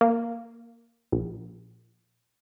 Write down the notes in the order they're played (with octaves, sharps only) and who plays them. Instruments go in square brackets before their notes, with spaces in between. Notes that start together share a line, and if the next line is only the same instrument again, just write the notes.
[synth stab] A#3
A#1